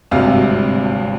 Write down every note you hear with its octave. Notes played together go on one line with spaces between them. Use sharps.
G#1 D2 G2 C3 F#3 F5